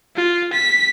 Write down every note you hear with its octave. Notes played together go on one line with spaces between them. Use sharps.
F4
B6